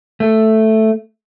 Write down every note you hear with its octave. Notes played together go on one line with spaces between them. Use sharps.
A3